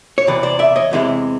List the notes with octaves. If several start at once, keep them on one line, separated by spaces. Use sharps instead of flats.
C#5
E2 C3 E3 D5
C5 D5
D5 E5
C#5 D#5
E2 C3 E3 G#3